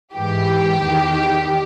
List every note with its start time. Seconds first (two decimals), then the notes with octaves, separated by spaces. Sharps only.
0.15 G#2 E3 G4
0.82 E2 D#3